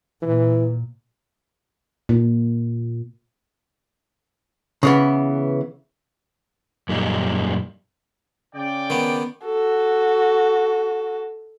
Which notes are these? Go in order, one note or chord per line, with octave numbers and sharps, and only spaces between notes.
A#2 E3
A#2
C#3 E3 B3
F#2 A#2 G3 D#4
C#3 D5 G5
D#3 B3
F#4 A4